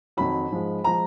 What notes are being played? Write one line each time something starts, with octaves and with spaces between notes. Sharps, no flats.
F2 D#3 F#3 B5
G#2 F3 G#3
F3 G#3 A#5